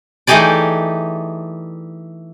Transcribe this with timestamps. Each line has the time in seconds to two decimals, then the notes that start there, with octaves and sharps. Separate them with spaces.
0.27 E3 A3 D#4 G4 G#4 D5